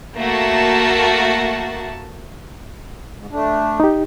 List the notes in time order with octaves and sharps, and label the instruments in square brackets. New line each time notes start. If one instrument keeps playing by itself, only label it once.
[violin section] A3 A#3 F#4 A5
[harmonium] G#2
A3 D4
[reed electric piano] D#4 G4